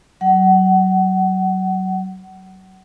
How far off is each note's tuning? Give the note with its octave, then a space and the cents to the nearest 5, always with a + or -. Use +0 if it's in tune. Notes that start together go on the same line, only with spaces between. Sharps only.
F#3 +25 F#5 +25